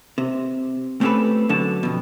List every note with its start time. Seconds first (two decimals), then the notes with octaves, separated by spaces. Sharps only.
0.18 C3
1.01 A3 C4 C#4 G4 A4 B4
1.49 F#2 D3 F#4 A5
1.83 F2 B2